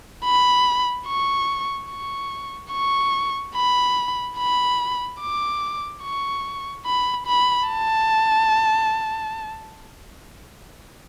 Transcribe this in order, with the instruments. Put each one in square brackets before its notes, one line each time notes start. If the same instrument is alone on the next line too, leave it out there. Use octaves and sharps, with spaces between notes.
[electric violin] B5
C#6
C#6
C#6
B5
B5
D6
C#6
B5
B5
A5